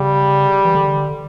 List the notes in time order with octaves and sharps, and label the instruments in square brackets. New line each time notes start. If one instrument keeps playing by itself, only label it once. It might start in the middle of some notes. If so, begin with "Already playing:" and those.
Already playing: [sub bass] C#3 [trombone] G3
[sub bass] E3
D3